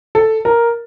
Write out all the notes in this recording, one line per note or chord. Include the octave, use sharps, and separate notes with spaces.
A4
A#4